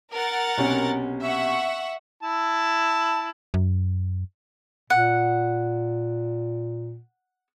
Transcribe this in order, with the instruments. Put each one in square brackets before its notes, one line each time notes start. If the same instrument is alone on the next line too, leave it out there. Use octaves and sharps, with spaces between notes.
[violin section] A#4 F#5 A6
[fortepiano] B1 C3 C#4
[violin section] E5 F#5 C#6
[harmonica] E4 A5
[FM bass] F#2
[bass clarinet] A#2 [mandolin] F#5